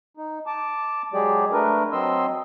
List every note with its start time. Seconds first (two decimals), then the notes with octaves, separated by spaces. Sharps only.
0.17 D#4
0.46 A5 D6
1.13 F#3 G#3 G4 G#4 D5
1.52 A3 D4 A#4 B4
1.92 F#3 C4 D#5 C6 E6